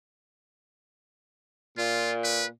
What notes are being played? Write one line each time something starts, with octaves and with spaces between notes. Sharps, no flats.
A#2 F4
B4